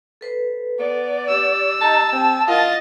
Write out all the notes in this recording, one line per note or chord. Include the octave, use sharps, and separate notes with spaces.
A4 B4 C5
B3 D5
G4 E6
D#4 A5
C4 A5
E4 F4 A#4 D#5 F#5 A6